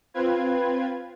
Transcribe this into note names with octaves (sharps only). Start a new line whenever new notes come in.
C4 F4 B4 G#6